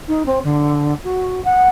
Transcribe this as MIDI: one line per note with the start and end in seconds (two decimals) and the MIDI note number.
0.08 0.26 63
0.26 0.39 60
0.44 0.94 50
1.04 1.43 66
1.45 1.68 78